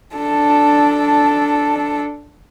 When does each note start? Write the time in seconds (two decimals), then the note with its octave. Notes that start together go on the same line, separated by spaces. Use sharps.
0.15 D4 A4